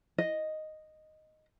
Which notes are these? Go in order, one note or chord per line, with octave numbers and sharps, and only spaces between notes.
D#5